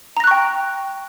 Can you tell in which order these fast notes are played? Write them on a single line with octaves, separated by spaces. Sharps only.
A#5 A#6 F#6 C#6 G5